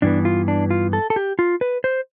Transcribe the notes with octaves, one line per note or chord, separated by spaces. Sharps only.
G2 E3 B3 D4
F4
D4
F4
A4
A4
G4
F4
B4
C5